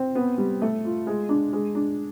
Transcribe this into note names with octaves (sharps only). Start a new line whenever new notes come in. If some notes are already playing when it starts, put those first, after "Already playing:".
Already playing: C4
B3
G3
A3
F4
G#3
D4
G#3
D4